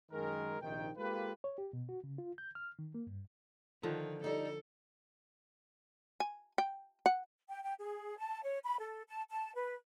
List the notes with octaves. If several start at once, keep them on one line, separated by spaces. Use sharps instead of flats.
F#2 D#3 G#3 G#4 A#4
A#1 C3 D#3 A#3 D#4 G5
G#3 A#3 F4 G4 A4 B4
C#5
G4
B2
F#4
C#3
F4
G6
F6
D#3
A#3
G2
D3 D#3 F3
G3 D#4 A4
G#5
G5
F#5
G5
G5
G#4
A5
C#5
B5
A4
A5
A5
B4